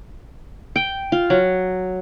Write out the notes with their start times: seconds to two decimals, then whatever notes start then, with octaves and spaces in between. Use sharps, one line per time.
0.76 G5
1.12 F4
1.30 F#3